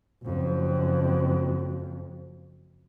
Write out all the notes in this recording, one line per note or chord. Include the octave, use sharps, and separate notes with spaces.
F#1 F2